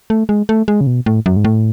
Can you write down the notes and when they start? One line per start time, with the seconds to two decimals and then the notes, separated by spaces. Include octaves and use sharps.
0.10 A3
0.29 G#3
0.49 A3
0.68 G#3
0.81 C#3
0.87 B2
1.06 A2
1.26 F#2
1.37 G#2
1.44 A2